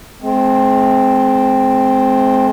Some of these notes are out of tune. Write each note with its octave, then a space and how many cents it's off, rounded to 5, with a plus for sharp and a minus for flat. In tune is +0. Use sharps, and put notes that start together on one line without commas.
G#3 +45 C4 +0